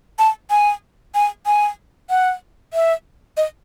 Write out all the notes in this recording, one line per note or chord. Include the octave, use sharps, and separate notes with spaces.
A5
G#5
G#5
G#5
F#5
E5
D#5